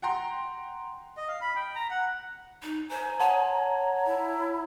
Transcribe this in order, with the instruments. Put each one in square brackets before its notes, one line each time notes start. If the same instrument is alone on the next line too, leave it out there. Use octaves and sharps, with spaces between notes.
[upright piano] F#5 G5 A#5 C6
[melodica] D#5
F5
B5
G5
A#5
F#5
[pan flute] D#4
[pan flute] C5 [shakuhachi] G#5 [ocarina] A#5
[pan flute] C#5 [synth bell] F#5 A5
[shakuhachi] E4